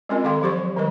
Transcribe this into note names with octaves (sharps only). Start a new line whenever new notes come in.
G#3 C4 C#4 F4 A#4 D#5
D#3 G#3 A4 F5 G5 C6
F3 F#3 G4 D5 C6 C#6
F#3
D#3 F#3 G3 A#4 B4 D#5